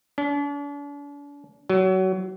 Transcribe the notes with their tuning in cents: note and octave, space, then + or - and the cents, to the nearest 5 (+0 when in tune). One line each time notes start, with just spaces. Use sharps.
D4 -40
F#3 +25